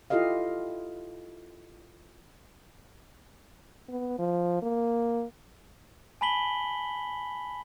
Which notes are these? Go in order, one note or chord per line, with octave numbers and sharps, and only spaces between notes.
E4 F4 G4 A4 D#5 F5
B3
F3
A#3
G#5 A5 B5 B6 F#7 G7